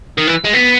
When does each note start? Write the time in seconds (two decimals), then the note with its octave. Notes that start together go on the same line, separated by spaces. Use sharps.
0.18 D#3
0.27 E3
0.45 G#3
0.54 B3